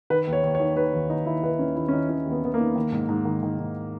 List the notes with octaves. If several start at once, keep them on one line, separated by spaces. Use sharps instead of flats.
D#3 B4
D#2
C#5
D#2
C#5
D#3
D#3 B4
D#2
D#2 D#4
D#3 E4
D#3 B4
D#2 C#4
D#2 E4
C#4
D#3 D#4
D#3 C#4
D#2
B3
D#2 B3
A#3
D#3
D#3
G#2
G#2
D#3
D#3
G#2